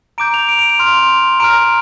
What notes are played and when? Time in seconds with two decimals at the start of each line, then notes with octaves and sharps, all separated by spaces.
0.18 A#5 D6 G6 D7
0.34 F7
0.49 D7
0.59 D7
0.69 F7
0.79 C6 F6
1.40 A#5 F6 D7